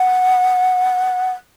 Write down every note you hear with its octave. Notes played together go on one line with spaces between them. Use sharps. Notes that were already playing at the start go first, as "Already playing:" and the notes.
Already playing: F#5